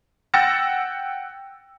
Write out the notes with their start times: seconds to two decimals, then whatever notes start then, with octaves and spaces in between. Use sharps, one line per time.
0.34 F#5 G5 E6 A6 A#6 C#7